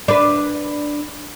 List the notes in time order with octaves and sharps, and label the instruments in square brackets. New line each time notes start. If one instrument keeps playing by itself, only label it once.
[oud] D4 B4